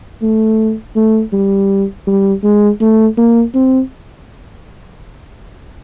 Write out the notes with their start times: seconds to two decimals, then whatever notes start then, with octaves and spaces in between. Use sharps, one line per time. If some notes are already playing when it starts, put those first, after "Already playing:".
0.22 A3
0.96 A3
1.33 G3
2.07 G3
2.43 G#3
2.81 A3
3.17 A#3
3.55 C4